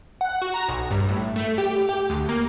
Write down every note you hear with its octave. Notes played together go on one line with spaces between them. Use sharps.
F#5
F#4
A#5
B1
G2
A2
A3
G4
G4
D2
A#3